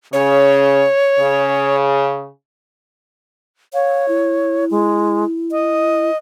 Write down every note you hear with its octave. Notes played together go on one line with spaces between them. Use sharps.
C#3 C#5
C#3
C#5 F5
E4
G#3
D#5